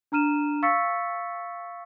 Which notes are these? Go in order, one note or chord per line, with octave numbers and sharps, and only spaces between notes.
D4 A#5 F6 D#7 E7
F5 C#6 E6 A6 B6 C#7